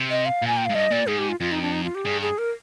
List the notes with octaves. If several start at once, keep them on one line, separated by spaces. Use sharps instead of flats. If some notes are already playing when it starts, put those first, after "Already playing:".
Already playing: C3
D#5
F5
A#2 G#5
G5
G#2 F5
G2 D#5
A#2 D5
G#2 G#4
G4
F4
F2 F4
D#4
D4
D#4
F4
G4
G2 G#4
G#4
A#4